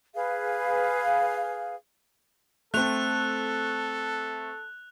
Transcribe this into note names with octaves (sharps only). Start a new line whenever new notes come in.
G#4 B4 F5
A3 C4 A4 F#6 F7